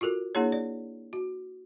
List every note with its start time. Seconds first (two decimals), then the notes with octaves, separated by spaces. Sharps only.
0.01 F4 F#4 A4 A#4
0.35 A#3 D4 E4 G#4 C#5
0.52 D5
1.13 F#4